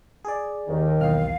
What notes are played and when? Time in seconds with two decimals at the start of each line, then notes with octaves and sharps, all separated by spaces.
0.25 G#4 D5
0.68 D#2 D#3
1.01 B1 E2 F5 F6